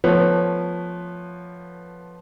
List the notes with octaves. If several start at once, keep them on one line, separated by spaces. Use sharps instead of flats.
F3 A3 B3 B4 C#5